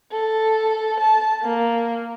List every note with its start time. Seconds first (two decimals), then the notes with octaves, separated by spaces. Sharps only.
0.11 A4
1.00 A5
1.43 A#3